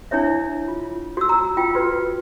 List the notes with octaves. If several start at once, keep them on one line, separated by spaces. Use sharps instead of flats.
D4 E4 C#5 E5
F4
F#4 E6
A#5
F4 G5
F#4 B4